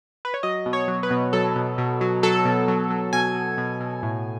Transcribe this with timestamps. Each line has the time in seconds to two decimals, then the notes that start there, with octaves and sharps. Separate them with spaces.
0.25 B4
0.34 C#5
0.43 F#3 D#5
0.66 B2
0.73 C#5
0.88 F#3
1.03 B4
1.11 B2
1.33 F#3 A4
1.56 B2
1.78 B2
2.01 F#3
2.23 F#3 A4
2.45 B2
2.68 F#3
2.90 F#3
3.13 B2 G#5
3.35 B2
3.58 B2
3.81 B2
4.03 A2